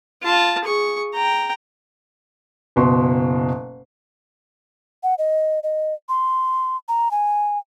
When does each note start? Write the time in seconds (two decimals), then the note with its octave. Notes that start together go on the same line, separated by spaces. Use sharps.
0.22 F4 A5
0.65 G#4 C#6
1.15 G5 A#5
2.76 F#1 B2 C6
5.03 F#5
5.18 D#5
5.63 D#5
6.09 C6
6.88 A#5
7.11 G#5